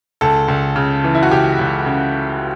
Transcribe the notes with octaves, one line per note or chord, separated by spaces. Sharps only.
C#2 A4
C#2
C#3
E3
E4
F#4
C#2 G4
C#2
C#3